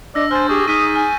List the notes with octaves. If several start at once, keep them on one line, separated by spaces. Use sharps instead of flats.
D4 D5 D#5 E6 A#6
C5 G#5 F6 G6 A6
G4 G#4 C#6
D#4 G#4 D#6 F6 B6 D#7
G#5 F6